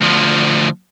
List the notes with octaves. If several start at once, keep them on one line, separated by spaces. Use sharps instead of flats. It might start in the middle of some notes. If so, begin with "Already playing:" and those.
D2 F3